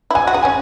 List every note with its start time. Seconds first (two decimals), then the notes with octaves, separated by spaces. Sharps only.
0.11 E4
0.15 F#4 G#5
0.27 F#4
0.34 G#4
0.43 C#4 G#5